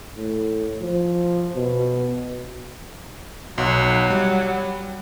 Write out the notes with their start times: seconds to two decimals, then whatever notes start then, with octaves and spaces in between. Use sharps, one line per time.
0.16 A2
0.82 F3
1.56 B2
3.58 B1 F#3
4.10 G3